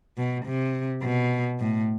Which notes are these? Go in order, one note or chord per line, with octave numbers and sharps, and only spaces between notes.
B2
C3
B2
A2